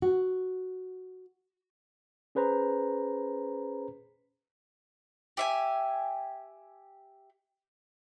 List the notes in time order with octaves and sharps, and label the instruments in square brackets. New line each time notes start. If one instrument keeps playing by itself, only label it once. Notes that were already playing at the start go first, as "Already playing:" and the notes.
[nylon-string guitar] F#4
[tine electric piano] C#4 G#4 B4 C5 A#5
[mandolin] G4 E5 G#5